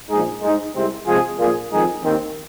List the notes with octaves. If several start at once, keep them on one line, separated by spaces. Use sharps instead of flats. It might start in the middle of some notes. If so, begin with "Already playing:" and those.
A#1 G#2 G#3 D#4 G#4
G#2 G#3 D#4
C2 C3 G#3 C4
C3 F3 G#3 F4 G#4
A#1 A#2 A#3 F4 G#4
F2 D#3 G#3 D#4 G#4
D#2 D#3 C4